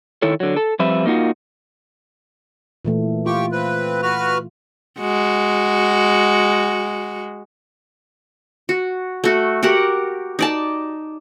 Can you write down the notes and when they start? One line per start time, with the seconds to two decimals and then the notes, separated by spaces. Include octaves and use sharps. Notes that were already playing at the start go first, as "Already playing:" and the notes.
0.22 D#3 E4 A4 C#5
0.40 D3 F#3
0.57 A4
0.79 F3 G3 C4 B4 E5
1.05 A#3 D#4 F4 F#4
2.85 A#2 E3 A3
3.26 F4 G4 G5 C#6
3.52 C4 B4
4.03 F#4 B4 F6
4.99 G#3 F#4
8.69 F#4
9.24 A3 F#4
9.63 F#4 G4 A#4 F#5
10.39 D#4 D5 A5